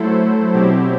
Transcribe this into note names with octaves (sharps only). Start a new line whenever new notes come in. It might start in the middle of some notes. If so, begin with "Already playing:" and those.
Already playing: F#3 A3 E4 A4 C5
B2 F#3 C4 E4 G4